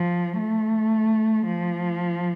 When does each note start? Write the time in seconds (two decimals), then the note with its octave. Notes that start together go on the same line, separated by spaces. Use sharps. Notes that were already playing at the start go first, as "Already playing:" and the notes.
Already playing: F3
0.38 A3
1.46 F3